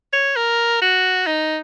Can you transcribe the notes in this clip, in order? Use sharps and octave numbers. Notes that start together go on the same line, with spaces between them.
C#5
A#4
F#4
D#4